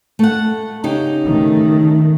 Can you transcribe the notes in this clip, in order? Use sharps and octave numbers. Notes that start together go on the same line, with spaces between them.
A3 F#5
C#3 D#4 G4
D#3 A3